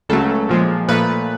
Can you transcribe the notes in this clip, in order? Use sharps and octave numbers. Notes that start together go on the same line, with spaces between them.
C#2 C#3 F#3 A3 A4
A#2 F3 G#3
A#2 F3 A3 B4